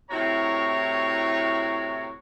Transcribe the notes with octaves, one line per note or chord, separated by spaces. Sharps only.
A2 C3 E4 F#4 C#5 A#5